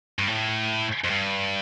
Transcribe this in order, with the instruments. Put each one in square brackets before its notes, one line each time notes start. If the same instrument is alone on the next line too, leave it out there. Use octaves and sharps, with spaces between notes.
[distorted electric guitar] G2
A2
F2
G2